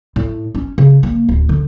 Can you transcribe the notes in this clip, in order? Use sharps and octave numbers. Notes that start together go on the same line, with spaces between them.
A2
C#4
C#3
A#3
D1
D3